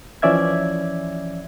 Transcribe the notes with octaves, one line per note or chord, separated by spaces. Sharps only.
E3 F3 C#4 D5 E5 G#6